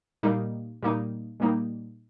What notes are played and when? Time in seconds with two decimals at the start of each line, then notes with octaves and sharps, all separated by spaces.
0.23 A#2 G3 A#3 D#4
0.83 A#2 G3 A#3 D#4
1.40 A#2 G3 A#3 D#4